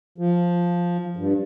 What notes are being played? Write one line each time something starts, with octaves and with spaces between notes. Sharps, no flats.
F3
G2